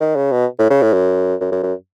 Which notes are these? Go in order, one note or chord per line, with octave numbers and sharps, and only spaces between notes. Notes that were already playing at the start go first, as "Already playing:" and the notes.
D#3
C#3
B2
A2
C#3
A2
F#2
F#2
F#2
F#2